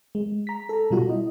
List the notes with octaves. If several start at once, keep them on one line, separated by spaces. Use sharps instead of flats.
G#3
A#5 B6
A4 A#5
B2 G3 F4 F#4
E4 D#5